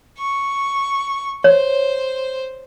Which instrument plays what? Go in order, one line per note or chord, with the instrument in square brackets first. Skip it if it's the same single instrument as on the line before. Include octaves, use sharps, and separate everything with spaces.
[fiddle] C#6
[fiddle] C5 [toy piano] C#5